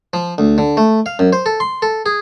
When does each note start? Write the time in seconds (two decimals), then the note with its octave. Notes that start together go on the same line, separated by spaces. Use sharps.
0.13 F3
0.38 D2
0.58 D3
0.77 A3
1.06 F5
1.19 F#2
1.33 C5
1.46 A4
1.60 C6
1.82 A4
2.06 G#4